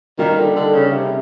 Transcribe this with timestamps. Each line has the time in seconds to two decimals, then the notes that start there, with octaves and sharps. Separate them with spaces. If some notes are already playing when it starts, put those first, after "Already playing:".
0.18 D#3 G3 A#3 D#4 G4
0.38 D3
0.56 D3
0.74 C#3
0.92 C3